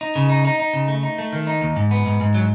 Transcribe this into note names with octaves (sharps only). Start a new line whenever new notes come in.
D#4
C#3
D#4
D#4
D#4
C#3
A3
D#4
A3
D#3
D#4
D#2
G#2
B3
G#2
G#2
F#3